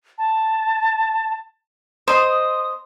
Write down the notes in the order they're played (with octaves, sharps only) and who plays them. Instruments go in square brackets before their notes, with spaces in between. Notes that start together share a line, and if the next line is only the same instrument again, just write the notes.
[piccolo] A5
[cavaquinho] C5 D#5 C6 [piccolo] D#6